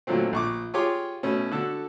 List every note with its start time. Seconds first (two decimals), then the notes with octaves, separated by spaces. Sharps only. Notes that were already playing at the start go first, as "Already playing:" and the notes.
0.07 A#2 D3 F#3 A3 C4
0.33 A#1 C#6 D6
0.74 F4 G4 G#4 C#5 C6 D6
1.23 B2 A3 C#4
1.52 D3 F#4 A4